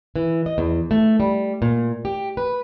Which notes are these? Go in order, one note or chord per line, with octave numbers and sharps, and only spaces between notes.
E3
D#5
E2
A3
G3
A#2
G4
B4